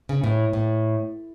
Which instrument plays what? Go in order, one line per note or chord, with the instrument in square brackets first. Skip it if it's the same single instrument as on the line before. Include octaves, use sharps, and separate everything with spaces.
[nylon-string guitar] C#3
A2
A2